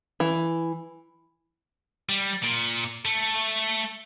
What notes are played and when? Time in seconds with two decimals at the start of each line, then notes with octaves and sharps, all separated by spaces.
0.20 E3
2.09 G3
2.43 A#2
3.05 A3